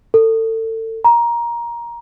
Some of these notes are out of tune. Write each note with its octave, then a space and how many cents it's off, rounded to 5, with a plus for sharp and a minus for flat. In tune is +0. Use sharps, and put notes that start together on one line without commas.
A4 +30
A#5 +15